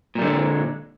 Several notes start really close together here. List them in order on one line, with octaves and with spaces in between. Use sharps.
A#2 G3 D3 G#3